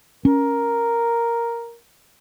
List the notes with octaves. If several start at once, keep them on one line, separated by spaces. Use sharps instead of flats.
C#4 A#4